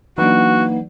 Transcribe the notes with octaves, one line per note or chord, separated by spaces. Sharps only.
E3 F#3 A#3 D4 D#4 F#4 B4 F#5